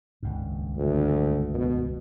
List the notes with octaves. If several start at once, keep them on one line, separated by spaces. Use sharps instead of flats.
D#1 C#2 G2
D2
B2